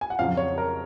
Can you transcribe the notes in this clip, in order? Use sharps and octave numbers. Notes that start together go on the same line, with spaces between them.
G#5
F#5
F2 C#3 F#3 F5
C#5
A#4